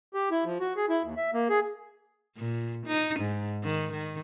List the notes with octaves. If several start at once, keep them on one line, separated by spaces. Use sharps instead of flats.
G4
E4
F3
F#4
G#4
E4
D#2
E5
A#3
G#4
A#2
D#4
G#2
D#3
D#3